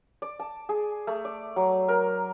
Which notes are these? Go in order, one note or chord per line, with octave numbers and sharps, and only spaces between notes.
D5
A5
G#4
A3
D5
F#3
A#4